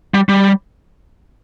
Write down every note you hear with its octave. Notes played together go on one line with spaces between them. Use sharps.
G3
G3